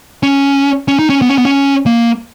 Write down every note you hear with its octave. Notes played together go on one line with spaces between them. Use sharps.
C#4
C#4
D#4
C#4
B3
C#4
B3
C#4
A#3